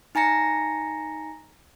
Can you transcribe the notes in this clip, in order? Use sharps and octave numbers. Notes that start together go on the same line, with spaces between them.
D#4 G#5 A#5 A#6 C#7